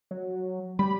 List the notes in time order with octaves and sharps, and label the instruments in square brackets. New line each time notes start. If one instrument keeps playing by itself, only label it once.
[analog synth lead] F#3
[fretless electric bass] G3 [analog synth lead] B5